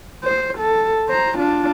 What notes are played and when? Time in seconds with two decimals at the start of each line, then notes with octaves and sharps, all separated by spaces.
0.24 C5
0.58 A4
1.09 C5 A#5
1.38 D4 F4